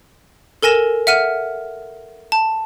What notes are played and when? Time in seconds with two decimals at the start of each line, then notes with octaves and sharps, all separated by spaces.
0.63 A4 A#4 G#5 A#6 E7
1.07 E5 F#5 F6 D#7
2.32 A5